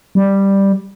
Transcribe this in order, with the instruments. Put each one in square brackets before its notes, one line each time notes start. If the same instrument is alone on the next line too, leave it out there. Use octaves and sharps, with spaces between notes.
[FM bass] G3